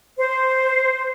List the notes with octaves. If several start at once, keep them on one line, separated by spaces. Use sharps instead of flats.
C5